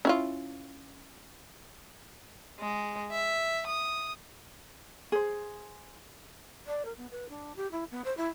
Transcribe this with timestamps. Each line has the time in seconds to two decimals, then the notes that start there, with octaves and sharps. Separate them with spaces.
0.05 C#4 E4 F4
2.59 G#3
3.11 E5
3.66 D#6
5.12 G#4 C5
6.66 D5
6.85 A#4
6.97 B3
7.11 B4
7.29 D4
7.56 G4
7.71 E4
7.91 B3
8.04 C5
8.17 E4